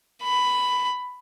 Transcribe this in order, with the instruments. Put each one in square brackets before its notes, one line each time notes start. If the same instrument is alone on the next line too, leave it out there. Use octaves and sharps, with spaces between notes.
[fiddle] B5